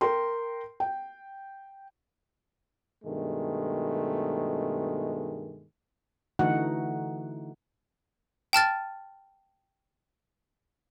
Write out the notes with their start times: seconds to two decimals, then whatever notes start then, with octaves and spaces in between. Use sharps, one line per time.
0.01 A#4 G5 C6
0.80 G5
3.05 G2 B2 D#3 G#3 A3
6.39 D3 E3 A3 D#4 F#4 F#5
8.53 G5 A5 F6 A6